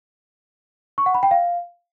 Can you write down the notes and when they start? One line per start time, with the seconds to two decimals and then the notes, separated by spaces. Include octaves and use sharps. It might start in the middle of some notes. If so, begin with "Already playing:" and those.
0.98 C#6
1.06 F#5
1.14 B5
1.23 G5
1.31 F5